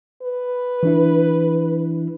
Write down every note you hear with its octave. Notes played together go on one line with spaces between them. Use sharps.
B4
E3 D4 E4